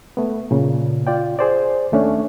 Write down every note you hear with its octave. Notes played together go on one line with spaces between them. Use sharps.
A3 B3
A#2 C#3
F4 D5 G5
G#4 C5 D5
D#2 A3 C#4 D4